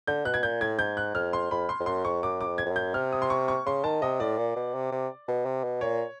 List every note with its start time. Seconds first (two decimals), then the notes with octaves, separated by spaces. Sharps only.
0.07 D3 G6
0.25 B2 F#6
0.34 G#6
0.43 A#2 G6
0.61 A2 G#6
0.78 G#2 G6
0.97 F#6
1.15 F2 F6
1.33 C6
1.51 F2 B5
1.69 C6
1.80 F2
1.86 F#2 C6
2.04 F2 C#6
2.23 F#2 D6
2.41 D6
2.46 F2
2.58 G#6
2.65 F2
2.70 F#2
2.76 G6
2.94 C3 F6
3.12 D#6
3.22 C6
3.30 C#6
3.48 C#6
3.66 C#3 C6
3.84 D#3 A5
4.02 C3 D#5
4.20 A2 D5
4.38 A#2
4.56 B2
4.74 C3
4.92 C3
5.28 B2
5.45 C3
5.64 B2
5.81 A#2 C#5